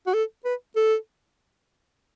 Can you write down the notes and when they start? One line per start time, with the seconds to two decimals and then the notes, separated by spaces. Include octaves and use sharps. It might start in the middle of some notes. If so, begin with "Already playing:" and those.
0.07 F#4
0.14 A4
0.45 B4
0.76 A4